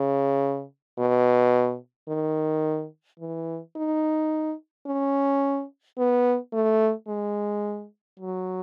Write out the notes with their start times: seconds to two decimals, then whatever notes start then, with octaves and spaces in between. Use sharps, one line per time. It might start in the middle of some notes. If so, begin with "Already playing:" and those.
Already playing: C#3
0.98 B2
2.08 D#3
3.20 E3
3.76 D#4
4.86 C#4
5.98 B3
6.53 A3
7.08 G#3
8.20 F#3